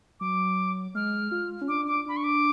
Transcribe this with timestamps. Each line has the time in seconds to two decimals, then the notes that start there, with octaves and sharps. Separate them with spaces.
0.20 F#3 D6
0.95 G#3 F6
1.31 F4
1.61 C#4
1.68 D4 D6
1.88 D6
2.06 D4 B5
2.17 C#6
2.24 D6